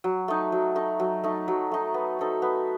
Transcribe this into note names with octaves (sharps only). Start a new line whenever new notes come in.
F#3
A3 D#4
F#3
A3 D#4
F#3
A3 D#4
F#3
A3 D#4
B3
D#4 A4 C5
B3